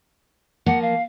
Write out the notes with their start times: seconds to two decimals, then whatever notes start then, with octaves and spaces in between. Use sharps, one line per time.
0.66 F3 A#3 F#5
0.82 F5